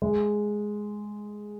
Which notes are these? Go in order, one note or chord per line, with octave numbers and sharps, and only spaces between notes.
G#3